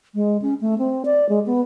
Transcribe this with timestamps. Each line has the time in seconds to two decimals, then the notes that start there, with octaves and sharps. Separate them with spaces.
0.15 G#3
0.42 C#4
0.61 A3
0.78 C4
1.05 D5
1.29 G#3
1.46 B3